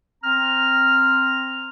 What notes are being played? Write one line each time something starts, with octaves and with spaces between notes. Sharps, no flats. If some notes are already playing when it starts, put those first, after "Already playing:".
C4 A#5 F6